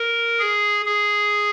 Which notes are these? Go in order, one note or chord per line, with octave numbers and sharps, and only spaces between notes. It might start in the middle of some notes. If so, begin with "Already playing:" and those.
Already playing: A#4
G#4
G#4